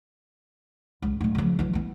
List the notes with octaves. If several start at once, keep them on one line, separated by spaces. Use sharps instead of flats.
C#2
D1 A3
C#3 F3
E3 F#3
E3 B3